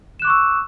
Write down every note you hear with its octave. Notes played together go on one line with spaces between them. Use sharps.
C#6 D6 E6 F#6 E7